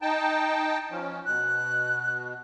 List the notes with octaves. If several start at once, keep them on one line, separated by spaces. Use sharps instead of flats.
D#4 G5 A5
F3 C#4
B2 F#6